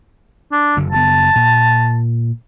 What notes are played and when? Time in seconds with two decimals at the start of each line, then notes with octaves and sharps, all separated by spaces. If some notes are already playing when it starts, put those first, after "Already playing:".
0.52 D4
0.77 F#1 F#2 D3
0.92 F#1 C3 B3 A5
1.35 A#2